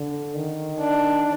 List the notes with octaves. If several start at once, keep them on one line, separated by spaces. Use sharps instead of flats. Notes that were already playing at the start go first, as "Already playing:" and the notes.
Already playing: D3
D#3
D4